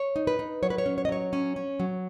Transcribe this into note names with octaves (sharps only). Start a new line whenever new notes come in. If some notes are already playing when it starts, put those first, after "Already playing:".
Already playing: C#5
D#4
B4
D#4
F#3 C#5
B4
C#5
C#4
C#5
D#5
F#3 C#5
C#4
C#4
F#3